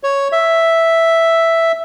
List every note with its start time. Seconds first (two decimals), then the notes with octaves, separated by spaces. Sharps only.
0.03 C#5
0.32 E5